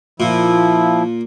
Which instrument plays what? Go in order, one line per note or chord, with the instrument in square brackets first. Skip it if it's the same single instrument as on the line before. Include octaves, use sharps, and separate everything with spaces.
[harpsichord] A#2 [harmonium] F3 E4